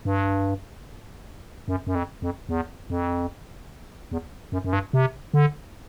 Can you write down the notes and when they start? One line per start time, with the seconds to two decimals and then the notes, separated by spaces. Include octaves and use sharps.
0.05 G2
1.68 F#2
1.87 F#2
1.95 F2
2.22 F2
2.49 E2
2.90 F2
4.11 E2
4.52 F#2
4.64 F#2
4.73 G2
4.93 C3
5.34 D3